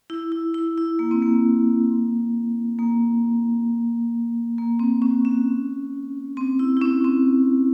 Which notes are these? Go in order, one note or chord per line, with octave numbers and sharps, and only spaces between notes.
E4
E4
E4
E4
A#3
C4
A#3
A#3
A#3
C4
C#4
C#4
C4
E4
E4
C#4
C4